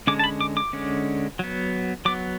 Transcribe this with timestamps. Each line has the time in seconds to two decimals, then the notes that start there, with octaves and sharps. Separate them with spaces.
0.07 D3 G#3 C#4 D6
0.19 A5
0.24 B5
0.41 D6
0.57 D6
0.73 D3 G#3 C#4
1.39 F#3 B3
2.05 F#3 B3 D6